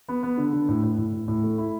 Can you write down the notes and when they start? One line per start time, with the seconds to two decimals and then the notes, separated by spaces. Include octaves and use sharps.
0.08 B3
0.23 B3
0.37 D3
0.53 D3
0.69 A2
0.83 A2
0.98 A2
1.13 A2
1.28 A2
1.44 A3
1.58 E4